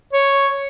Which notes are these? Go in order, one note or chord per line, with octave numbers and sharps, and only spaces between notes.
C#5